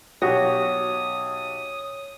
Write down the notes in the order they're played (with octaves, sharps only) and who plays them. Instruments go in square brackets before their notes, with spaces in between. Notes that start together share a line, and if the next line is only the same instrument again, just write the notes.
[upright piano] B1 G4 [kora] F#4 [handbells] C#5 [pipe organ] D#6